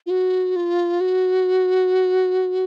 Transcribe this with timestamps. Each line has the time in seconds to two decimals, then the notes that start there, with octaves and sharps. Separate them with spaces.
0.06 F4
0.10 F#4
0.56 F4
1.00 F#4